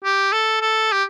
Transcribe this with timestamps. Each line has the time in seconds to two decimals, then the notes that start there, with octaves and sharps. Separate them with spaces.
0.04 G4
0.32 A4
0.61 A4
0.92 G4